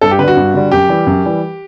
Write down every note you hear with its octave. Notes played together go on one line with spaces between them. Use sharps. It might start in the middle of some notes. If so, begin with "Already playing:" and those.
G2 A4
G4
D3 G3 F#4 B4
G2
D3 G3
F#2 G4
E3 G3
F#2
E3 G3